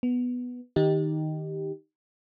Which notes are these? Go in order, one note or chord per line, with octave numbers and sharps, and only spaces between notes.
B3
D#3 D#4 G4